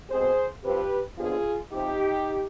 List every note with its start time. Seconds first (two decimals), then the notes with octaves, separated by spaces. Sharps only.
0.11 B2 G#3 C4 G#4 C5
0.65 G2 F3 C4 G4 B4
1.18 D#2 D3 F3 B3 F4 G#4
1.72 C3 F3 C4 D#4 G4